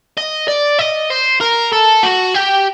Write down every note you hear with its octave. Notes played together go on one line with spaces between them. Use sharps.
D#5
D5
D#5
C5
A#4
A4
F#4
G4